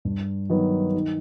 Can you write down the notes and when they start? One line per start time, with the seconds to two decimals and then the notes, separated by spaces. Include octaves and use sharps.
0.05 G2
0.50 D#3 F#3 B3
0.94 D#3